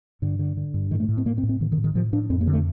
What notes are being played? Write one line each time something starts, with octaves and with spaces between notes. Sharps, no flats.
G2 D3
D3
D3
G2
A2 D#3
A3
A2
C4
A2 A#3
C4
A2
C4
A2 D#3
D#3
A2
D#3
A2 F3
A2 D4
F2 C4
A#3
D3
A3